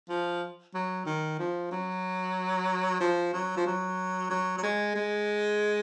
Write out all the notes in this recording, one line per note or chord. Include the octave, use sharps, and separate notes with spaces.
F3
F#3
D#3
F3
F#3
F3
F#3
F3
F#3
F#3
F#3
G#3
G#3